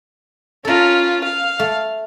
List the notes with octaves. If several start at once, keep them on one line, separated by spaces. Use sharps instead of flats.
C#4 F4 A4 A#4
F5
A3